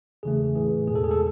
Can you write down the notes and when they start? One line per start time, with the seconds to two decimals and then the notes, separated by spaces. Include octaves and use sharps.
0.23 E2 C#3 E3 A3 G#4
0.55 A2 E3 A3 G#4
0.87 E2 B2 G#3 G#4
0.95 A4
1.04 G#4
1.11 A4